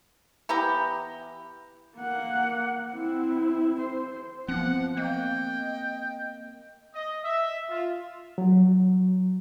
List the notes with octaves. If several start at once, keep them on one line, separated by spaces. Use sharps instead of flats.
E3 B3 G4 A#5
A#3 F#5
C4 E4
C5
F3 B3 C4 F#5
A#3 D#5 G5
D#5
E5
F4
F#3